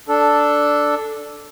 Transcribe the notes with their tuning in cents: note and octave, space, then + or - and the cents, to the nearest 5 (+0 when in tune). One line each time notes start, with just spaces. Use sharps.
D4 +0 A4 +0